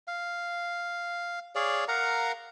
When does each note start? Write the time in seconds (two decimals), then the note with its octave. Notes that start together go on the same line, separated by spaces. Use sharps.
0.07 F5
1.55 G#4 C#5 D5 F5
1.88 A#4 F5 F#5 A#5